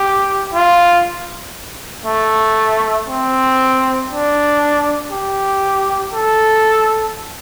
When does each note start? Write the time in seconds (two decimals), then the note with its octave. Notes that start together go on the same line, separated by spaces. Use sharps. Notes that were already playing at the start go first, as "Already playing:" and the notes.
Already playing: G4
0.54 F4
2.05 A3
3.08 C4
4.09 D4
5.11 G4
6.13 A4